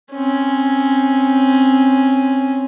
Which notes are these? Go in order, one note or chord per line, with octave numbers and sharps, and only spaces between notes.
C4 C#4